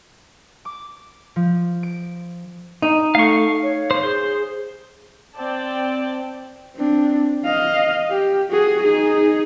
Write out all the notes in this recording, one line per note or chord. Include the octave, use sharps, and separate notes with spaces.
D6
F3
D7
D#4
A3 F5 C#6
C#5
C5
G#4 C5
C4 D5 G5 A5
C4 D4
D#5 F5
G4
F#4 G#4
D#4 G#4